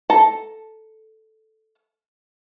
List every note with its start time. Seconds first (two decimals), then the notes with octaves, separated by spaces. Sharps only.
0.10 A4 A5 A#5